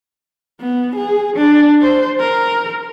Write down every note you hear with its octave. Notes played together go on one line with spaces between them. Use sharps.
B3
G#4
D4
C5
A#4